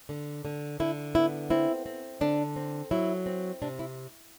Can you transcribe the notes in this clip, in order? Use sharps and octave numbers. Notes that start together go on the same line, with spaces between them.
D3
D3
D3 E4
B3 E4
C4 E4
C4
D3 D4
C4
F#3 E4
C4
C3 D4
E4